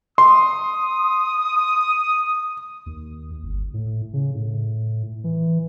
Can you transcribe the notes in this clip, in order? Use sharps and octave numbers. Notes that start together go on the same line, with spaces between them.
C6 D#6
D#2
G1
A2
C#3
A2
E3